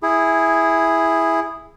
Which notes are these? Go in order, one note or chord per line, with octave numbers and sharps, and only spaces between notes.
E4 G#4